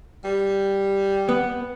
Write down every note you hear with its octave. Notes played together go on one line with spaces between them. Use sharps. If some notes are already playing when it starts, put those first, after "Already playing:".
G3
B3